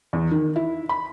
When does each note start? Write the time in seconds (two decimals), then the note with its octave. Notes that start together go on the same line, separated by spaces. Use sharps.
0.13 E2
0.31 D#3
0.56 E4
0.89 B5